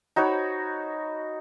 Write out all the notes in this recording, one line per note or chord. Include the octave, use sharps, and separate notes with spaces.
D#4 F#4 C#5 B5